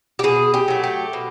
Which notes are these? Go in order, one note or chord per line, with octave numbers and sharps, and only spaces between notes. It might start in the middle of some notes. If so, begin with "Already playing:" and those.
G4
B2 G#4
G4
F#3 A3
G4
B2